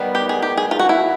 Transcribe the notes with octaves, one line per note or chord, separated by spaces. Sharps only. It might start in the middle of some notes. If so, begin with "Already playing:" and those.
Already playing: D#3 G3 B3
G4
G#4
G4
G#4
F4
F#4
E4